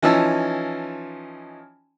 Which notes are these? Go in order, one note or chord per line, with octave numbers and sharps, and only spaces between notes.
E3 F3 C#4 D#4 A5 E6